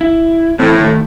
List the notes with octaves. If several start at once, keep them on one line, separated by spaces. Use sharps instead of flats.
E4
A2 E3 C4
D#3 A3